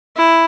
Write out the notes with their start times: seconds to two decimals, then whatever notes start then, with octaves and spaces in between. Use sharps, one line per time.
0.17 E4